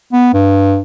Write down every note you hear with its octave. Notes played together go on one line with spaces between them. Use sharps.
B3
G2